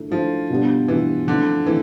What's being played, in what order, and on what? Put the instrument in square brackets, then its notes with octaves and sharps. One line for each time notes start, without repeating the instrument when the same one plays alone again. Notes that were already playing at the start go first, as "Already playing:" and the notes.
Already playing: [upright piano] D3 A3 E4
[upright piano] D3 A3 E4 [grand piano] F3
[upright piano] B2 G3 B3 D4
[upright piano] B2 G3 B3 D4 [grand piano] E3
[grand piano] D3 [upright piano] F3 A3 C4 E4
[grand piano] E3 [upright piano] A3 C4 E4